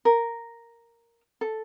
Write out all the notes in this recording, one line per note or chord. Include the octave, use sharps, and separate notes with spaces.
A#4
A4